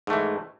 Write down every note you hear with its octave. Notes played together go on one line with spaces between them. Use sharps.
G#2 E3 A3